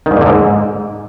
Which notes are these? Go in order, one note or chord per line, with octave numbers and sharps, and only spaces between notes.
D#3
G#2
A#2
D3
G#2